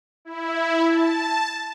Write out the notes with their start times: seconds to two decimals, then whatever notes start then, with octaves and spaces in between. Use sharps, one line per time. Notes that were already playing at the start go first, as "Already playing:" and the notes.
0.25 E4
0.86 A5